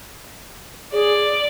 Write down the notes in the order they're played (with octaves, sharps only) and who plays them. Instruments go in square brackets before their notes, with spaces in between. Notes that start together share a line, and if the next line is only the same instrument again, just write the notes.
[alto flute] G#4 [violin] D5